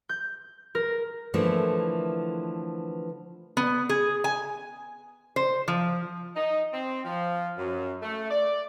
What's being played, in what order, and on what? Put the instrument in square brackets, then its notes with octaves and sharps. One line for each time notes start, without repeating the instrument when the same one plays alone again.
[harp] G6
A#4
[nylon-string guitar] D3 E3 F3 A3 A#3 E4
[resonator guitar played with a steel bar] B3
G#4
G#5
C5
F3
[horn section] D#4
C4
F3
F#2
A3
D5